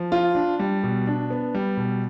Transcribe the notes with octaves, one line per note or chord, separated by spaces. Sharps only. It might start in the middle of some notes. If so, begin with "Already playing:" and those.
Already playing: F3
F4
D4
G3
B2
D4
B3
G3
B2